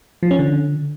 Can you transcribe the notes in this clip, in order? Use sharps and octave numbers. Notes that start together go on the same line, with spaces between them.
F3
C#4
D3